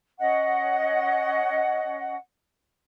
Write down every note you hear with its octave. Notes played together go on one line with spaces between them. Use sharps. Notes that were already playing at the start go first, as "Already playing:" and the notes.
C#4 D#5 F#5